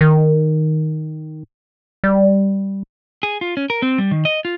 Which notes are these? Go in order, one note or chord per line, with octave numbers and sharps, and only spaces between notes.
D#3
G3
G#4
F4
C#4
A#4
C4
G3
D#3
D#5
F4